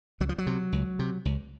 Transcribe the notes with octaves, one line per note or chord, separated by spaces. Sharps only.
C#2 F#3
F3
F#3
C3
C#2
C3
C#2